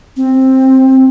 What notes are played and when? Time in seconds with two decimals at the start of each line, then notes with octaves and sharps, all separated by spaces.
0.17 C4